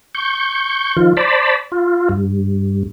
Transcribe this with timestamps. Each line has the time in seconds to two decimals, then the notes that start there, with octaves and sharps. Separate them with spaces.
0.15 C#6 G6
0.97 D#3 F3 F4
1.17 C5 D5 A5 B5
1.72 F4
2.09 G2